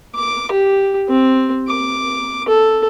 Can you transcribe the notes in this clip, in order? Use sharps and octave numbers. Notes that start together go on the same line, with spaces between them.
D6
G4
C4
D6
A4